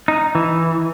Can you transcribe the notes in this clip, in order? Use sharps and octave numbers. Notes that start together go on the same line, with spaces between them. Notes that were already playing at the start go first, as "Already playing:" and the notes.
D#4
E3